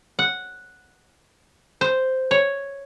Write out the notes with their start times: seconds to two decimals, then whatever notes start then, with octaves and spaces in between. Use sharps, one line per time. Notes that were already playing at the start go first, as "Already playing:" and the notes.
0.19 F#5
1.81 C5
2.31 C#5